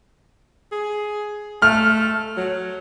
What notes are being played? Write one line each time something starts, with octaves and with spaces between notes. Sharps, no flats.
G#4
A3 F6
F#3